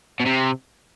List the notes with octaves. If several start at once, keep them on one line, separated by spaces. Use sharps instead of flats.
B2
C3